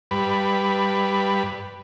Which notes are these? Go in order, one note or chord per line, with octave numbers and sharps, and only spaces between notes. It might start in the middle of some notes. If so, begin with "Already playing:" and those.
G2 B4